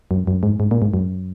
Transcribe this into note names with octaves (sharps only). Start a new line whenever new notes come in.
F#2
F#2
G#2
G#2
A#2
G#2
F#2